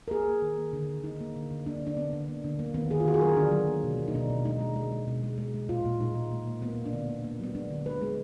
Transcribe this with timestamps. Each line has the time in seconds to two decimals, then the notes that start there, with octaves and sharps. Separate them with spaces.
0.08 A#4
0.11 A#3 G#4
0.28 A#3
0.42 D#3
0.58 A#3
0.73 D3
0.89 D3
1.04 D3 D#4
1.20 A#3
1.36 D3
1.51 D3
1.66 A#3 D4
1.82 D3 D4
1.97 D3 B3
2.13 D3
2.28 A#3
2.44 D3
2.59 A#3
2.74 D#3 B3
2.90 D#3 G#4
3.00 F4
3.06 D#3 F#4
3.14 G#4
3.21 F#3 A#4
3.37 D3 D4
3.52 F#3
3.67 A#3
3.84 B2
3.99 A#3
4.08 D#4
4.14 B2 D4
4.30 B2
4.45 G#3 D#4
4.61 G#3
4.76 G#3
4.92 G#3
5.08 B2
5.23 G#3
5.38 G#3
5.54 G#3
5.69 A#2 F4
5.85 A#2
6.00 G#3 D#4
6.15 G#3
6.32 A#3
6.47 A#3
6.62 A#3 B3
6.77 B2
6.86 D4
6.93 D3 B3
7.09 A#3
7.24 A#3
7.40 F#3 B3
7.55 G#3 D4
7.71 D3
7.86 G#3 B4
8.01 G#3